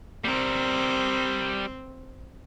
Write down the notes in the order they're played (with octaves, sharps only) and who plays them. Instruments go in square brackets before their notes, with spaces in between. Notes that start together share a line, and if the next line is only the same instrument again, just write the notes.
[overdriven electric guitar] G3 A#4 [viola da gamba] C4